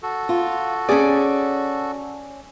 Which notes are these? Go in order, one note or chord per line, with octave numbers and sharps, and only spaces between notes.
F#4 A4
F4
C#4 G#4 D5